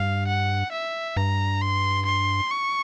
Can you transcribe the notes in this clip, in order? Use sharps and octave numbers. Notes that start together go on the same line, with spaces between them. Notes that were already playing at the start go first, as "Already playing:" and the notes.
Already playing: G2 F5
F#5
E5
G2 A#5
C6
C6
C#6